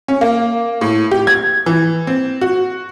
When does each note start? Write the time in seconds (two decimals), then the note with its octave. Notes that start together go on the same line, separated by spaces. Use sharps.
0.08 C#4
0.21 A#3
0.81 A2
1.11 G4
1.27 G#6
1.66 E3
2.07 C4
2.41 F#4